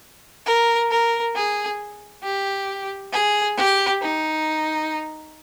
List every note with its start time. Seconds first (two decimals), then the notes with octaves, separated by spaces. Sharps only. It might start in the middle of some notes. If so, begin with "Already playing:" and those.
0.46 A#4
0.91 A#4
1.35 G#4
2.23 G4
3.13 G#4
3.57 G4
4.01 D#4